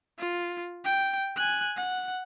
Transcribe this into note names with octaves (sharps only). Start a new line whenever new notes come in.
F4
G5
G#5 F#6
F#5